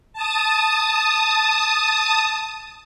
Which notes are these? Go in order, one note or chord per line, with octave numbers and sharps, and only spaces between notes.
A5 D#6